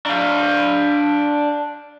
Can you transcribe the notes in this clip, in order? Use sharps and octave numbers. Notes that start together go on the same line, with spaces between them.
D4 F5